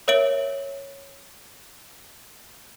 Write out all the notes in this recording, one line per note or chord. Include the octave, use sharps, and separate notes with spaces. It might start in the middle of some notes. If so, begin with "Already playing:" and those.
A#4 C#5 E5 D7 F#7